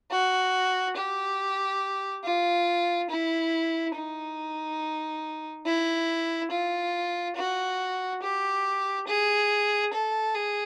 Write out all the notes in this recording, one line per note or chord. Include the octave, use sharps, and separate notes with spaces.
F#4
G4
F4
E4
D#4
E4
F4
F#4
G4
G#4
A4
G#4